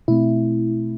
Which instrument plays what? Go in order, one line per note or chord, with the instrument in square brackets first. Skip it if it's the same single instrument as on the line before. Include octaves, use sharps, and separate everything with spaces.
[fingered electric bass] B2 A3 C4 [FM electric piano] E4